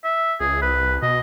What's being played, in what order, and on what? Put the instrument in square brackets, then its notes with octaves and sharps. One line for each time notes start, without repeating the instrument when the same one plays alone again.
[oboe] E5
[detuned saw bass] C#2 [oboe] G#4
[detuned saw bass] C2 [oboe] B4
[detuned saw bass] B2 [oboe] D#5